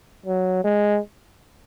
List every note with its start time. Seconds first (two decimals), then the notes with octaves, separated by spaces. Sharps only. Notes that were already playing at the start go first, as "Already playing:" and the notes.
0.26 F#3
0.64 G#3